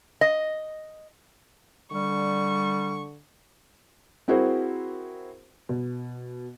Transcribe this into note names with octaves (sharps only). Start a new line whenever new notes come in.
D#5
D3 G3 C#6
C4 E4 F#4 G#4 A#4 C5
B2